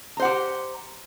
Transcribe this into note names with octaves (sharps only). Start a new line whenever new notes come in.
G4 C5 F#5 A#5